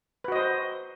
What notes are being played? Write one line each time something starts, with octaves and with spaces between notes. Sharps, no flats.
F#4 B4 C5 D#5